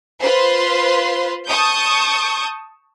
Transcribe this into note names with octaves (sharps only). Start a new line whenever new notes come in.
F4 B4 C5 C6
A5 C#6 D#6 G6